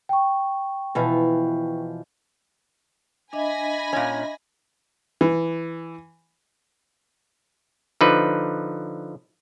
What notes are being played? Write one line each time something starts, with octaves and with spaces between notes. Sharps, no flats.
G5 C#6
B2 E3 F3
D4 D#5 E5 G#5 B5 A#6
A#2 C#4
E3
D3 F3 D#4 B4